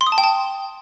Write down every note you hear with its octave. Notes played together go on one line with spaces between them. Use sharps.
C6
D#6
A5
G5
A5